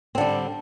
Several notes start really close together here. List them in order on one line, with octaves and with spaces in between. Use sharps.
C4 D3 G3